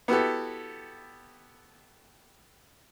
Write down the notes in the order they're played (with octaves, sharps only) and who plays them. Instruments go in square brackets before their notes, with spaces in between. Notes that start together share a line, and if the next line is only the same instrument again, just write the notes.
[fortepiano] B3 E4 F#4 G4 A4